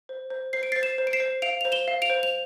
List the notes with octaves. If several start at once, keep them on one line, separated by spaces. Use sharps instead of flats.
C5
C5
C5 C7
D7
C5 A6 C7
C7 E7
C5
D7
C7 E7
C5
F5 D7 F7
C5 F7
E7 G7
F5
D7 F7
C5
F7